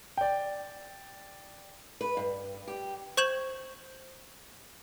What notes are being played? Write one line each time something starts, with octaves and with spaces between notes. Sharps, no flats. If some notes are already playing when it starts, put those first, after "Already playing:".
D5 G5
B4
G2
G4
C5 C#6 G6 G#6 E7 F#7